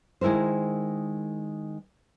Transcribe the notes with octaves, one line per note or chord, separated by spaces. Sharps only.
D#3 G#3 E4 A#4 C5